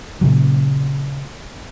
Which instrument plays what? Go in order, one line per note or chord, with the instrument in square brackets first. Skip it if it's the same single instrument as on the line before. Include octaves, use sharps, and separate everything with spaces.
[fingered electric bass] A#2 C#3 F#3